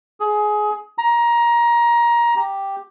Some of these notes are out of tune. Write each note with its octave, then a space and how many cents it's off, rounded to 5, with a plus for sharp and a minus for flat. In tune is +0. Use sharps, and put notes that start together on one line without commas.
G#4 +20
A#5 +20
G4 +0